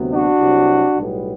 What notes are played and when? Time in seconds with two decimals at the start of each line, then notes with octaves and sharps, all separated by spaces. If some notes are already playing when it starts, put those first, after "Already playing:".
Already playing: D2 C3 F#3 B3
0.12 D4 F#4
0.40 C2 C3 F#3
0.96 B1 A2 G3 B3